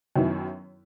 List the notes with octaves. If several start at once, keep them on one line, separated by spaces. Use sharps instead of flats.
F#2 D#3 F#3 B3 E4